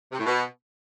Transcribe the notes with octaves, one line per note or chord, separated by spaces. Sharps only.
C3
A2
B2